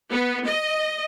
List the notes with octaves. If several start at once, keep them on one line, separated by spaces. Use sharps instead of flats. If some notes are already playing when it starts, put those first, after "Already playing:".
B3
D#5